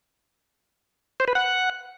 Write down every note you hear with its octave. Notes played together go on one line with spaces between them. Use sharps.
C5
B4
F#5